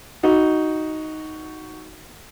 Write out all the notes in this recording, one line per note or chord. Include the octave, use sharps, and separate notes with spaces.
D#4 F#4